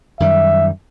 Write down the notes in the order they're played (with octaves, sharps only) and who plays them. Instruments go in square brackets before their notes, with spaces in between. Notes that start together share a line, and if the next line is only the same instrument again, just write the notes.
[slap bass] F#2 D#3 G3 [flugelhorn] E5